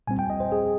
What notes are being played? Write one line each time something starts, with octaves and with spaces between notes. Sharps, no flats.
A#2 G3 C4 G#5
G5
D#5
C5
G#4